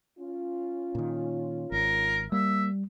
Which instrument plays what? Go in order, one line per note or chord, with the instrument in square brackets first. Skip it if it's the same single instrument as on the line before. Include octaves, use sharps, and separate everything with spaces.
[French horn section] C#4 F4
[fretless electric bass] A#2 D#3
[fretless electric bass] G#1 [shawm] A#4
[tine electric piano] G3 [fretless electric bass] A#3 [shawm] E5